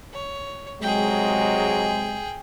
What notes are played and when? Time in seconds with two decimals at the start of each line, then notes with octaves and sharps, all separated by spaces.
0.13 C#5
0.82 C3 F#3 G#3 G#4 G5